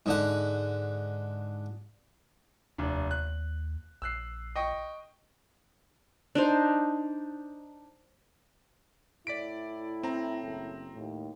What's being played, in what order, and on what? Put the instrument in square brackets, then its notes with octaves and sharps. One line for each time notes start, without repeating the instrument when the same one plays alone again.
[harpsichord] G#2 D3 F#5
[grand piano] F1 D4 [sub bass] D#2
[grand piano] F#6
[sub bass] A#1 [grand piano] E6 F#6 C7
[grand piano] D#5 G5 C#6
[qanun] D4 D#4 C5
[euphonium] A2 [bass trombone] E4 [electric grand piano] D5 B6 D7
[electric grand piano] C4 A#5
[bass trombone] F#1
[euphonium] D#2 [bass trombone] A2